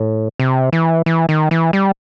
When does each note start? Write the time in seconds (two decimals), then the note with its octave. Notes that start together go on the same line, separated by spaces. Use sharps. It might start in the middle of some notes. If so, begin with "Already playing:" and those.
Already playing: A2
0.39 C3
0.73 E3
1.06 E3
1.29 D#3
1.51 E3
1.73 G3